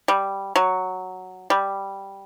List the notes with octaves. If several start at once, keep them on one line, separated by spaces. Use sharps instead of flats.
G3
F#3
G3